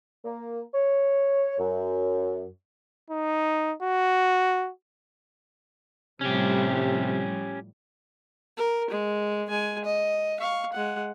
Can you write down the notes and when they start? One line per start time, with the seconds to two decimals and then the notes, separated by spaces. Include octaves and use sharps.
0.25 A#3
0.74 C#5
1.58 F#2
3.10 D#4
3.82 F#4
6.21 A2 C3 F3 G3 C#4 G4
8.57 A#4
8.90 G#3
9.49 G#3 G#5
9.84 D#5
10.40 F5 C#6
10.73 G#3 F#5